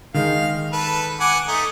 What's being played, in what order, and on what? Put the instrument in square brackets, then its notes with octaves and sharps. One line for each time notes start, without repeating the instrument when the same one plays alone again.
[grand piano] D#3 G#3 D#4 [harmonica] F5
[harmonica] A4 B4
F#5 G#5 D6
A3 D#4